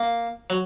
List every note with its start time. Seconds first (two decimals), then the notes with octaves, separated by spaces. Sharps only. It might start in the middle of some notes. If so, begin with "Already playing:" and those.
Already playing: A#3
0.50 F#3